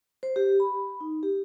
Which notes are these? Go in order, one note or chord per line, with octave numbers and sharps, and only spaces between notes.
C5
G4
B5
D#4
G4